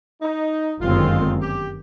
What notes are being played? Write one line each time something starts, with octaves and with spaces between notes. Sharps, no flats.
D#4
G1 F#2 D#3 G#3 C4 F4
G4